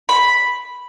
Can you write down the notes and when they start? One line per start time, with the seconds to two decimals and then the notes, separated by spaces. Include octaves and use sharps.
0.09 B5